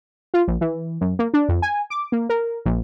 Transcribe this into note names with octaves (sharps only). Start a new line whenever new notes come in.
F4
A#1
E3
F#2
A#3
D4
F2
G#5
D6
A#3
A#4
A#1